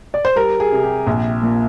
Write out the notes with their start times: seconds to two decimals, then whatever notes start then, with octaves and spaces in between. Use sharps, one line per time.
0.14 D5
0.25 C5
0.36 G3 A#4
0.60 G#4
0.72 C3
0.84 G4
1.07 A#1
1.42 A#2